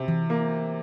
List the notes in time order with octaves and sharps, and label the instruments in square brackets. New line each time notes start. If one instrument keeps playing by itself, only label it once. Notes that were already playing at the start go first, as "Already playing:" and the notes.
Already playing: [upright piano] C3
[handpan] E3
[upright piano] A#3